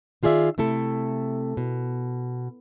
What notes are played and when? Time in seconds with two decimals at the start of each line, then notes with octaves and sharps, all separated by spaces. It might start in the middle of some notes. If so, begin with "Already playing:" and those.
0.23 D#3 F4 G#4 D5 E5
0.58 C3 A3 E4 A4
1.57 B2